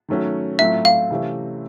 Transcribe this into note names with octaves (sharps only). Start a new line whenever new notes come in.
D#3 F#3 A3 C#4 F#4
A2 F#3 A3 C4 F4 E5
F5
C3 E3 A3 C#4